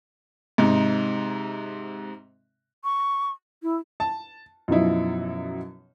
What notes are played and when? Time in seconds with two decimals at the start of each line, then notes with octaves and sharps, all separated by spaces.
0.58 G#2 C3 D#4
2.84 C#6
3.63 E4
4.00 A5
4.68 F#2 B2 F3 D#4 E4